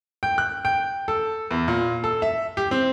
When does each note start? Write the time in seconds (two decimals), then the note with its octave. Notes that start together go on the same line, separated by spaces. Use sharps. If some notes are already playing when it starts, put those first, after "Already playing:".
0.23 G5
0.38 F#6
0.65 G5
1.08 A4
1.51 E2
1.68 A#2
2.04 A4
2.22 E5
2.57 G4
2.71 C4